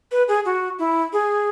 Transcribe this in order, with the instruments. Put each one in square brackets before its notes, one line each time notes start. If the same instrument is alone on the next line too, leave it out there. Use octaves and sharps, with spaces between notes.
[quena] B4
G#4
F#4
E4
G#4